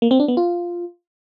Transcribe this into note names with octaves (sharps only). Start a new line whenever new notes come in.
A#3
C4
D4
B3
F4